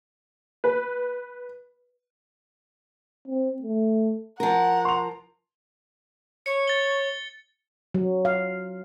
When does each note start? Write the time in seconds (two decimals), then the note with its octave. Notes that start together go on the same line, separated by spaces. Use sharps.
0.64 B4
3.28 C4
3.62 A3
4.40 F3 A#4 F#5 A#5
4.85 C6 F7
6.46 C#5 C#7
6.68 A6 G7
7.94 F#3
8.25 F5